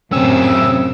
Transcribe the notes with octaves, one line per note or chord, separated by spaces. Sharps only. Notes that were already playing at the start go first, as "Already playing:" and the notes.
F#2 A2 C3 C4 C#4 C5 G5 E6